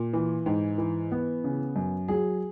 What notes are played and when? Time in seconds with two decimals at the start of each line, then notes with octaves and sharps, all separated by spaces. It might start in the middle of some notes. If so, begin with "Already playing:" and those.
Already playing: A#2
0.13 E3
0.46 G#2
0.78 E3
1.12 B3
1.44 C#3
1.76 F#2
2.08 F#3 G#4